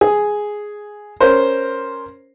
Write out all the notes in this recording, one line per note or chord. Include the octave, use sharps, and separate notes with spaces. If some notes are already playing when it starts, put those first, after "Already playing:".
G#4
C#4 A#4 C5